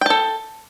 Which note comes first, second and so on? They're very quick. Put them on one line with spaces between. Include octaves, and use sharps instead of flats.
G5 A5 A4